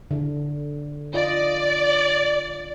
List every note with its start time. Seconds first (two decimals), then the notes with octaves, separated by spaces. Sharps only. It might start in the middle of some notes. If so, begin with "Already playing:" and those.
0.11 D3
1.14 F4 D5 D#5